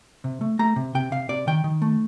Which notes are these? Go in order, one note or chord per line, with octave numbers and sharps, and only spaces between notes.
C3
A3
A3 A#5
C3
C3 G5
C3 F5
C3 D5
D#3 G5
D#3
A3